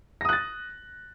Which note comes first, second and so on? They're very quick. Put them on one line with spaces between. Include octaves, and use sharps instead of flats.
A#6 D#6 F#6 A6